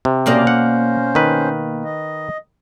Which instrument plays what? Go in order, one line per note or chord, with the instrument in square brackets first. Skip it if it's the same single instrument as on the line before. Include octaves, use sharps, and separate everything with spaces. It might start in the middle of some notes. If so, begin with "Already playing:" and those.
[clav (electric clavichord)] C3
[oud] B2 A#3 D5 [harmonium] C#4 C5
[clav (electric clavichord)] F#5
D#3 B4
[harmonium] D#5